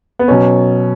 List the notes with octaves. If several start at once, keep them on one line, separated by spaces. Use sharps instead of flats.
B3
B2 F#3 C#4